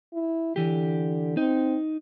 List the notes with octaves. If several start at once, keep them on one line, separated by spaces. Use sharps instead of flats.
E4
D3 E3 G4
C4 D#4